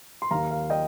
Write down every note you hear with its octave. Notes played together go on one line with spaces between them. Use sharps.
C6
D#2 D#3 A#3 F5 A#5
F5
D#5 G5